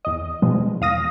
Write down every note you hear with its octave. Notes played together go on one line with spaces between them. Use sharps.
E2 D#5
B2 F3 G3 G#3
E2 F5 D#6 A#6